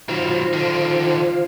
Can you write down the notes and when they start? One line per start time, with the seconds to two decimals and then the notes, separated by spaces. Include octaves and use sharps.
0.09 D#3 F#3 F4 C5
0.53 D3 D#3